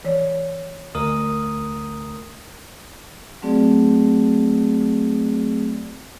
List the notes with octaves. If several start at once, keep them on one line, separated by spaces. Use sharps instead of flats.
E3 C#5
D2 A#4 D#6
F#3 A3 C4 F#4 G#4 D5